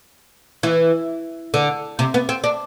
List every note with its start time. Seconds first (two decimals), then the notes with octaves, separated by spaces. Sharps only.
0.63 E3
1.54 D3
1.99 C3
2.14 B3
2.29 C4
2.44 D4